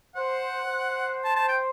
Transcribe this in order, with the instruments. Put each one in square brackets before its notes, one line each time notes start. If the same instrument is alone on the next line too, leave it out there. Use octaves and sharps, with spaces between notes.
[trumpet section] C5 [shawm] F#5
[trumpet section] C5
[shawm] A5
A5
G5